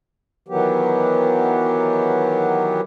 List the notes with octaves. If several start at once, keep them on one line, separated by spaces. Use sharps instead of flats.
D#3 E3 F#3 B3 G4